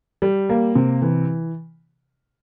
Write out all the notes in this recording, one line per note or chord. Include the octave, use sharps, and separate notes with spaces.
G3
A#3
C3
E3